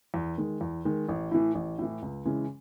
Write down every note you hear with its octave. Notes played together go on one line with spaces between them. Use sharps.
E2
D#3 G#3
E2
D#3 G#3
A1
A2 E3
A1
A2 E3
C#2
C#3 E3 G#3 C#4